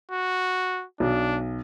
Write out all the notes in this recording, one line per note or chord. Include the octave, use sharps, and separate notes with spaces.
F#4
B1 D4